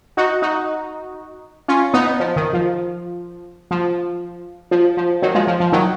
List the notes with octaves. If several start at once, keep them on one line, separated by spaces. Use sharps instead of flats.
D#4 F#4
D#4 F#4
C#4 F4
B3 D#4
F3
D#3
F3
F3
F3
F3
D#3 F#3
F3 G#3
F3
F3
D#3 F#3